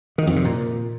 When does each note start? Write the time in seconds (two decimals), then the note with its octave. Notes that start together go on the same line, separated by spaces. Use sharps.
0.18 D#3
0.27 F2
0.36 C3
0.45 A#2